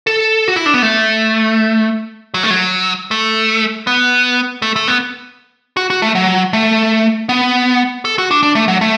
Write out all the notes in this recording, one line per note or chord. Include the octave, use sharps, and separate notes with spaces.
A4
F#4
E4
D4
B3
A3
F#3
A3
F#3
A3
B3
A3
A3
B3
F#4
F#4
A3
F#3
A3
B3
A4
F#4
D4
D4
A3
F#3
A3